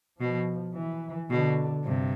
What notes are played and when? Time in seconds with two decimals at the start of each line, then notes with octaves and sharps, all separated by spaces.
0.19 B2 F3
0.74 E3
1.30 B2 D3
1.84 G2 C3